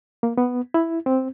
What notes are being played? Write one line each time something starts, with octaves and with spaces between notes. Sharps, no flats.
A#3
B3
E4
C4